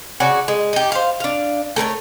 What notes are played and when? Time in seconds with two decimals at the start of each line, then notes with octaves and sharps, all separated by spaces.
0.20 C#3 F#4 C#5 D5
0.48 G#3
0.73 D#4 G4
0.92 C5 F5
1.20 D4 F5
1.76 A3 A#4 B4 C#5